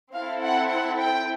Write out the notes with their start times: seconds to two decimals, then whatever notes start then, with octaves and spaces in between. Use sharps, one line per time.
0.13 C4 E4 A4 F5
0.42 F#5
0.70 F#5
0.98 G5